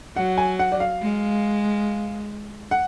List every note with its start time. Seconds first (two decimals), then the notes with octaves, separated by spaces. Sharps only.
0.16 F#3 F#5
0.38 G#5
0.59 F#5
0.72 D5
0.80 F5
1.02 G#3
2.71 F#5